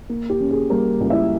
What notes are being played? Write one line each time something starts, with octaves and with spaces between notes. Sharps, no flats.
A#3
G4
C#3
G#4
G3 A#3 A#4
C#2
E4 E5